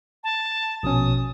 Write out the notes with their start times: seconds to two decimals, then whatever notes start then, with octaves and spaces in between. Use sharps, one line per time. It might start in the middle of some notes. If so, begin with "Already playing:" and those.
0.24 A5
0.83 A#1 B2 C#4 D#6